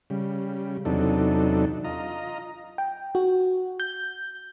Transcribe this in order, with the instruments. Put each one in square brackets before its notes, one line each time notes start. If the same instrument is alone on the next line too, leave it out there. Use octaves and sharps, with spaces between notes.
[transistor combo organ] C#3 G3
E2 C3 F#3 D4 D#4 A4
F4 D#5 A#5
[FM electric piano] G5
F#4
G6